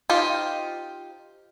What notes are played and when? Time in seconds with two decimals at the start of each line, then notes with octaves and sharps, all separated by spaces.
0.10 D#4 F4 G4 C5